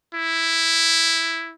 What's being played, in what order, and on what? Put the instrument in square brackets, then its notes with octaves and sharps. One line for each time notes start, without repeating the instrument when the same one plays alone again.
[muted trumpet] E4